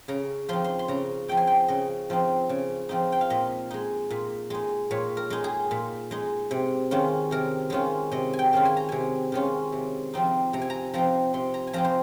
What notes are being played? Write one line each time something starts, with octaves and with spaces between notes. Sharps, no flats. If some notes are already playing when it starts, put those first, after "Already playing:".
C#3 A#5
F3 C4 D#4 C6
C6
C6
C#3 A#5
F3 C4 D#4 G5
G#5
G5
C#3 D#5
F3 C4 D#4
C#3
F3 C4 D#4
G5
F5
A#2 D#5
G#3 D#4
A#2
G#3 D#4
A#2 C#5
A#4
G#3 D#4
G#4
A#2
G#3 D#4
C3
D#3 G#3 C#4 F4
C3 A#4
D#3 G#3 C#4 F4
C3 D#5
G#5
G5
D#3 G#3 C#4 F4
G#5
A#5
C3 G#5
D#3 G#3 C#4 F4
C3
F3 C4 D#4
C3 A#5
G#5
A#5
F3 C4 D#4 A#5
C3 C6
A#5
G#5
F3 C4 D#4 A#5
C5